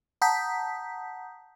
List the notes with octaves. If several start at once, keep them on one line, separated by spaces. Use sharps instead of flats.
F#5 A5 A#5 D#6 G6 B6